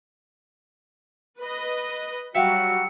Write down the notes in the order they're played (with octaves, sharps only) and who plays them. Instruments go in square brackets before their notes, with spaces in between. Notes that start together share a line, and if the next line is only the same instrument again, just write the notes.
[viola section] B4 D#5
[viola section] F#3 G3 [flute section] F#4 E6 [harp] E5 F5 G5 [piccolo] C#7